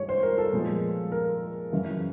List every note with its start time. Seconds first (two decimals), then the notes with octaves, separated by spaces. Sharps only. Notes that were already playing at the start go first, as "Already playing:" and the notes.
Already playing: G2 D#3 G#3 C#5
0.09 C5
0.23 A#4
0.38 A4
0.53 A#2 F3 G#3 B3
1.12 A#4
1.72 F#2 C#3 E3